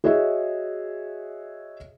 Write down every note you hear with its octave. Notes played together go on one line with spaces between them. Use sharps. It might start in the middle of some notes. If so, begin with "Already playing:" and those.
F#4 G#4 C#5 D#5 E5